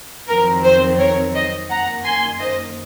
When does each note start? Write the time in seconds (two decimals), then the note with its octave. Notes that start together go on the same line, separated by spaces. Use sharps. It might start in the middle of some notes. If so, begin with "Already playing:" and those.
0.27 F2 D#3 F#3 C4 A#4
0.63 C5
0.98 A#4 C#5
1.33 C5 D#5
1.69 F#2 D#3 A#3 F#5 A#5
2.04 G#5 C6
2.40 C5 D#5